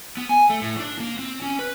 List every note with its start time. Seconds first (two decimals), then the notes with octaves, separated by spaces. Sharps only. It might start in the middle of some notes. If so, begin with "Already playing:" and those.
0.17 B3
0.29 G#5
0.50 A3
0.62 A2
0.79 D4
1.00 A#3
1.19 C4
1.42 C#4
1.59 B4